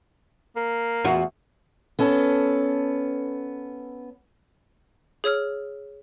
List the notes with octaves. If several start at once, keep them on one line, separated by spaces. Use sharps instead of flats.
A#3
E2 F4 F#4
B3 C#4 A4
G#4 C#5 E6 F6